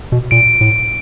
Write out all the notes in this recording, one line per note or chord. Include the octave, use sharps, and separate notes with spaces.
B2
A#2 D7
A2